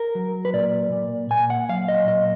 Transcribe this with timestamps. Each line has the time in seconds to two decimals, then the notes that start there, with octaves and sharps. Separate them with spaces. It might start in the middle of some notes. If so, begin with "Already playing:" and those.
Already playing: A#4
0.15 F#3
0.45 B4
0.53 A#2 D5
0.92 A#2
1.31 A#2 G#5
1.50 F#5
1.69 F#3 F5
1.88 D#5
2.07 A#2 D#5